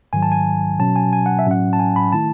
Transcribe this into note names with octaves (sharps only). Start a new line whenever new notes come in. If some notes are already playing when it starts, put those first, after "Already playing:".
G#2 D#3 F#3 G#5
A5
G#5
B2 F#3 C#4 A5
G#5
G#5
F#5
E5
A2 F#3 C#4 F#5
A5
G#5
B5
D#3 A3 E4 A5